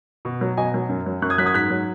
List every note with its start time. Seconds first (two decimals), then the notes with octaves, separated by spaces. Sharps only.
0.25 B2
0.41 F#3
0.57 B2 D#5 G#5
0.74 F#3
0.89 F#2
1.06 F#3
1.22 F#2 C#6 F#6
1.30 D#6 G#6
1.38 F#3 F#6 B6
1.46 D#6 G#6
1.54 G#2 F#6 B6
1.70 F#3